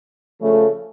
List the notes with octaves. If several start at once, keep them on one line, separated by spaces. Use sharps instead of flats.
C#3 F3 A3